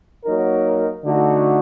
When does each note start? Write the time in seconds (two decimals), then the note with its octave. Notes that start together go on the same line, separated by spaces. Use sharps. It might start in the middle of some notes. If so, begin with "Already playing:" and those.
0.25 F#3 A#3 D#4 F#4 A#4
1.05 D3 A3 D#4 F#4